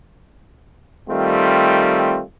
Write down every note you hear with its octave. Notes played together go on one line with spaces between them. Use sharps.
D#3 G3 A3 C4 F4